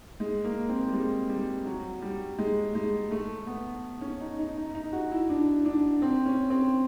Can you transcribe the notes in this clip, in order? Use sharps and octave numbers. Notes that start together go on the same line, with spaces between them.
G#3
A#3
C4
G3
G#3
G3
F#3
G3
G#3
G#3
A3
B3
C#4
D#4
D#4
D#4
D#4
F#4
E4
D4
D4
C4
C#4
C4